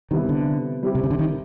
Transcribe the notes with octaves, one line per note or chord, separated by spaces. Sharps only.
C3 D#3 E3 G3 B3 E4
D3
G3 C4 E4 G4
C3
C#3
D3
D#3